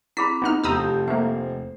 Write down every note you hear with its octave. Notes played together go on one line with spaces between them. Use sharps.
C4 E4 G#4 B5 B6
B3 D#4 F4 F6
F1 F3 G4 A5 A#5 D#6 E6 G6
A3 A#3 C5